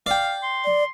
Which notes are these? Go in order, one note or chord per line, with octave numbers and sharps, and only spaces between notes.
D5 F5 G5
C6
D5